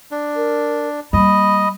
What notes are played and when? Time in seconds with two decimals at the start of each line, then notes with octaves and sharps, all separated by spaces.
0.11 D4
0.36 A#4
1.13 G3 A#3 D#5 B5